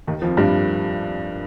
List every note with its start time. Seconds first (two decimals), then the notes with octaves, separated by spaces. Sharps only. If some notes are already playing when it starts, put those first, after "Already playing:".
0.07 D#2 D#3
0.22 F2 F3
0.37 G2 G3